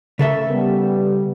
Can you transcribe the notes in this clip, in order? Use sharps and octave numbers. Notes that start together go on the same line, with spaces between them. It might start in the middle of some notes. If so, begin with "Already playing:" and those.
C#3 A3 A4 A#4 E5
G3 B3